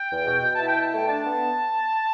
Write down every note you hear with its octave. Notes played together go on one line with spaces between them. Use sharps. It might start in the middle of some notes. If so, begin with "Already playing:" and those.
Already playing: G5
E2
B2
B2
E4 A5
G5
B2
A5
A3 G5
D4 A5
B3